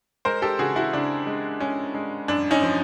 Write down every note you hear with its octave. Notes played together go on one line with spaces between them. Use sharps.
G#3 A#4 C5
G4 A4
C#3 F#4 G#4
E4 F#4
C#3 D4
G#3
G#3 C#4
G#3
F#2 D4
C#4 D#4
F3